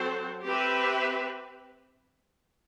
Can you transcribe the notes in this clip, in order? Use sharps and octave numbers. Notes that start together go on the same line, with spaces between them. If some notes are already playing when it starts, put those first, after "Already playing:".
Already playing: F#3 C4 F#4 A4 C5
C4 G4 B4 E5